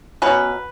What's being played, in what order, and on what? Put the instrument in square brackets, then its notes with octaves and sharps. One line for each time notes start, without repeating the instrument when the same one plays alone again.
[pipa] B2 F#3 C#4 B4